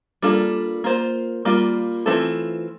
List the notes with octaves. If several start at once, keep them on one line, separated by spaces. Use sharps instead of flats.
G3 A#3 D4 F4 A4
A#3 F4 C5
G3 A#3 F4
E3 A3 C4 F4 A4